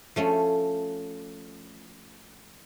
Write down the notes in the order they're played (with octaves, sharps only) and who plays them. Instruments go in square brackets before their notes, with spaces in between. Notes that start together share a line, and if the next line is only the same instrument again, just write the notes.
[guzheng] F3 A3 C#4